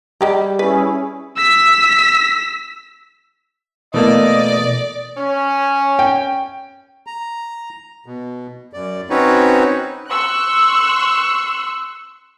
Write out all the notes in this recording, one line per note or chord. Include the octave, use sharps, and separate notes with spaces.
G3 G#3 G4 A#5
C#4 E4 G#4 B4
E6 B6
B2 E3 A3 A#3 D5 D#5
C#4
G5
A#5
B2
F#2 D5
C4 C#4 D#4 F#4 B4 C#5
C6 C#6 E6 F#6